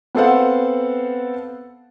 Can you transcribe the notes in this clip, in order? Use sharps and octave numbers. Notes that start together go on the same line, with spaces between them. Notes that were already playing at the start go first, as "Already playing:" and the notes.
B3 C4 A4 C5 F5 F#5